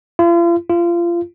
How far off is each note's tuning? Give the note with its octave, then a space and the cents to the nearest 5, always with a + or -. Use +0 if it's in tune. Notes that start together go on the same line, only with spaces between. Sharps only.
F4 -40
F4 -25